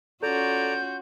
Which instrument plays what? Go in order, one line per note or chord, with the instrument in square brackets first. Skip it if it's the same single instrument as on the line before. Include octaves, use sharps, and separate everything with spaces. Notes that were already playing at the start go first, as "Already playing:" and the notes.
[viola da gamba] C#4 F4 F#4 [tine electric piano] A4 [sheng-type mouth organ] D5 A#5 [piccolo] G6